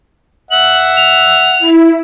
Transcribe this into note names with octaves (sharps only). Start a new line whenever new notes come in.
E5 F#5 F#7
F7
E4